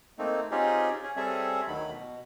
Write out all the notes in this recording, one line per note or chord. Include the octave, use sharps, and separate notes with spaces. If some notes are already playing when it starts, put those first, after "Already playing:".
A3 A#3 C4 D#4
C4 C#4 D#4 F4 G4 G#4
C#4 G#4
G3 C4 C#4 G#4 A4 E5
D2 D3 D#3 F#3 B5
B2